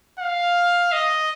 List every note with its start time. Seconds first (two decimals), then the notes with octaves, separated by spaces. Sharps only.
0.19 F5
0.92 D#5